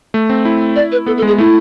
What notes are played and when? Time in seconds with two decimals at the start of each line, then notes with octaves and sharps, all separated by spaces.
0.14 A3
0.30 C4
0.45 E4
0.76 D5
0.92 B4
1.06 B3 A4
1.17 A4
1.22 G#3
1.27 G#4
1.38 A3 E4